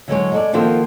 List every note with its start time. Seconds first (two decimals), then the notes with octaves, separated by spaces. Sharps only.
0.08 D3 F#3 G#3 C#5
0.32 G#3 A4 D5
0.53 D#3 F3 A#3 F4 F#4 A4